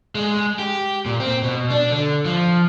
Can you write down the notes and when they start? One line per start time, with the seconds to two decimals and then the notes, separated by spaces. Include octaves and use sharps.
0.15 G#3
0.59 G4
1.06 A#2
1.20 C4
1.43 B2
1.70 D4
1.90 D3
2.25 F3